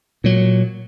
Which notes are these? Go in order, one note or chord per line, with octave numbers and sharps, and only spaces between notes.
A#2 F#3